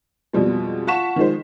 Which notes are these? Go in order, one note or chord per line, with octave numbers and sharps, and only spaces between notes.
F2 B2 G3 G#3
F4 F#5 A5 C#6 B6 E7
D#3 F3 G#3 C5